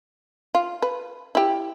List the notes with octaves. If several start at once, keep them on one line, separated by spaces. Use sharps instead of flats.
F4
B4
E4 G4